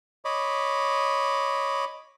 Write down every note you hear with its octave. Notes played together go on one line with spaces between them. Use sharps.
C#5 D#5 B5 D6